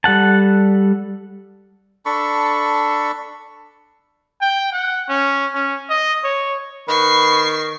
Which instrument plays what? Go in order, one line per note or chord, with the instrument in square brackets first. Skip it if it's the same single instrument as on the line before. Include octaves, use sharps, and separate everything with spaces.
[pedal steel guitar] G3 A4 F#5 A5
[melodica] D4 A4 B5 C#6
[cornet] G5
F#5
C#4
C#4
D#5
C#5
[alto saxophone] D#3 [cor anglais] B4 [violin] C#6 C7